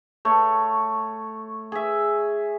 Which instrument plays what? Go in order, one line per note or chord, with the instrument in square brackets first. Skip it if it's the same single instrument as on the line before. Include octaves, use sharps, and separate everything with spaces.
[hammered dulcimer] A3 C#5
G#4 E5